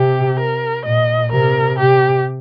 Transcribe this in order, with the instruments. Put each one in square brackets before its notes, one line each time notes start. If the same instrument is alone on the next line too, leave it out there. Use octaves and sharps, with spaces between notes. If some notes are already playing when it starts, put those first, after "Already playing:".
Already playing: [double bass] C3 [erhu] G4
[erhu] A#4
[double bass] A#2 [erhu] D#5
[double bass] C3 [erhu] A#4
[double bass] C3 [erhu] G4